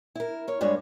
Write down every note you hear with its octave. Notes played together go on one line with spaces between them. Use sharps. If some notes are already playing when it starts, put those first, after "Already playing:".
E4 A#4
A#4 C#5
G2 G#3 D4 B4 C#5